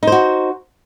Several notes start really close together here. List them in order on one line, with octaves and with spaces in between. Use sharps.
D#4 C5 F#4